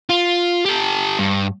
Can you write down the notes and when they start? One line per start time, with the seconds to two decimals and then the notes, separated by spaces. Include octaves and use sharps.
0.09 F4
0.65 G4 A4
1.19 G2